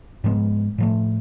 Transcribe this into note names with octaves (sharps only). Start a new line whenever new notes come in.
G#2 F3 G#3 B3
A2 F3 A3